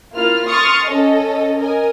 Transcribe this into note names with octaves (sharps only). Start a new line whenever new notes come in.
A#3 E4 F4 F6
C6 C#6 D#6 F6 A6 C#7
C#4 A4 D#5
A#4 D#5 G#5